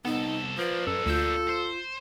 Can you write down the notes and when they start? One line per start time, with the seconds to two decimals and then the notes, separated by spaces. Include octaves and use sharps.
0.05 C2 B3 D#4 A4
0.58 F3 A#3 D4 B4
0.87 F#2 A4
1.06 D2 F4 E6 G6
1.49 C5